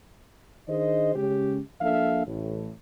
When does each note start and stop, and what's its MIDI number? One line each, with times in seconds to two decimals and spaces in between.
0.68 1.14 51
0.68 1.14 62
0.68 1.14 68
0.68 1.14 72
0.68 1.14 75
1.16 1.59 49
1.16 1.59 56
1.16 1.59 61
1.16 1.59 67
1.81 2.25 53
1.81 2.25 58
1.81 2.25 62
1.81 2.25 69
1.81 2.25 76
1.81 2.25 77
2.26 2.70 33
2.26 2.70 45